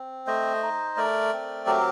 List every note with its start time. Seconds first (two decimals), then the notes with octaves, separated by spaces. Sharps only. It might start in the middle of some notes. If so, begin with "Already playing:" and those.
Already playing: C4
0.27 A3 C5 D#5
0.63 D#4
0.97 A3 A#4 D5
1.33 C4
1.66 F#3 G4 A#4